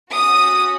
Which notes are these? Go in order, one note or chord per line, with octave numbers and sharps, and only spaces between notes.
C#4 F#4 D#6